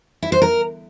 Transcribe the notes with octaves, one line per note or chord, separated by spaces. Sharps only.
E4
C5
A#4